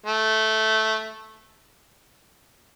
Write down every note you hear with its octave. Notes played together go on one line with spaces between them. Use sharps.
A3